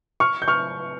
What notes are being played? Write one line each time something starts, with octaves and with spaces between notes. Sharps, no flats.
C#6 F6
G6
C#6 F6